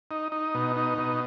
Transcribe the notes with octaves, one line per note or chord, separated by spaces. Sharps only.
D#4
D#4
B2
D#4
B2